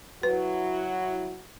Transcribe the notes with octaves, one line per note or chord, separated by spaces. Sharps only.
F#3 E4 F#4 B4